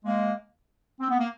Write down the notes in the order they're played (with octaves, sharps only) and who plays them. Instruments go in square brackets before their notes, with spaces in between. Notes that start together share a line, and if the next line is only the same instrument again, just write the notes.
[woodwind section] G#3 A#3
C4
B3
A#3